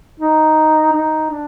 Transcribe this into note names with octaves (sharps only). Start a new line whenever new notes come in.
D#4
D#4
D4